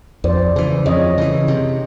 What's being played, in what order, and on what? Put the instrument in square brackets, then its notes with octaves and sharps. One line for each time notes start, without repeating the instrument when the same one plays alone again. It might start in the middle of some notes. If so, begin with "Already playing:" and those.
[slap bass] F2 [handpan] C5 D5
[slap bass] C#3 E3
[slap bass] F2 [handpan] C#5 D#5
[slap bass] C#3 E3
C3